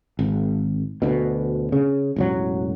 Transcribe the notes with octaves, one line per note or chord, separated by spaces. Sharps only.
G#1
D2 B2
C#3
E1 A1 F#3